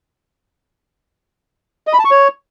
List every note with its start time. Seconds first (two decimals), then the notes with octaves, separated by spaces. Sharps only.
1.87 D#5
1.93 B5
1.99 A5
2.05 C#6
2.11 C#5